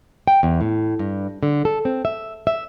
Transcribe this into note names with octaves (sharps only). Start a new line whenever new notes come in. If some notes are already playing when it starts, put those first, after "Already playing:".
G5
E2
A2
G2
D3
A4
C4
E5
E5